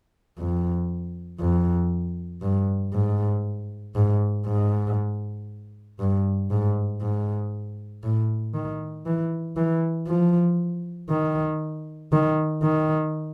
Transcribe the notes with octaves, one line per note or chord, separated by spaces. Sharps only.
F2
F2
G2
G#2
G#2
G#2
G2
G#2
G#2
A2
D#3
E3
E3
F3
D#3
D#3
D#3